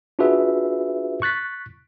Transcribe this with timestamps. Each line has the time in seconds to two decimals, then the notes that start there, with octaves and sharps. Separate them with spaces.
0.19 D4 F4 F#4 G#4 B4 E5
1.22 C#6 F#6 A6 B6